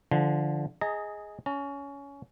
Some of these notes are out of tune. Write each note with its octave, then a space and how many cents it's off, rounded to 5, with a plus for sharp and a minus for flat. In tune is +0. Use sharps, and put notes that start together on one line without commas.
D3 +0 F3 -20
G#4 +0 D#5 +15 A#5 -30
C#4 +20 A#5 -40